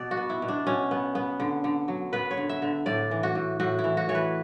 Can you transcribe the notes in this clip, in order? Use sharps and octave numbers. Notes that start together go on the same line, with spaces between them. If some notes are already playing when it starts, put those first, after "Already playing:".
Already playing: B2 D5
F#4
B3
E4
B2
D4
B2 C#4
B3
B3
D3
D3
F#3
B3 B4
C#5
D3
E5
D3
A2 D5
E3
F#4
A2
A2 F#4
E4
E3
F#4
E3 C#5
B4